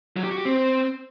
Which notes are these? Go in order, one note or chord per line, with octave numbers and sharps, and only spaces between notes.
F#3
G4
F#4
G4
C4